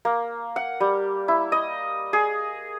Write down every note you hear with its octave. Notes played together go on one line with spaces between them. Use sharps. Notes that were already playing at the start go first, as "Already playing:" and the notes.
A#3
F#5
G3
E4
D#5
G#4